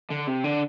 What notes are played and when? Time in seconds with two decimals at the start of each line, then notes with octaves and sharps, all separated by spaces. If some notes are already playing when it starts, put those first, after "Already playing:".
0.11 D3
0.28 C3
0.44 D3